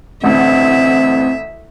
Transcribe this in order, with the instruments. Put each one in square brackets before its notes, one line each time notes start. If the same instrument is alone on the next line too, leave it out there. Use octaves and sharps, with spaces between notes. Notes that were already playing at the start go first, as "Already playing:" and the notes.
[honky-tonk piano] A1 D2 [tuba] C4 [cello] E5